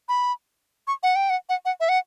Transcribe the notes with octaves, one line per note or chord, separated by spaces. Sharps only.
B5
C#6
F#5
G5
F#5
F#5
F#5
E5
F#5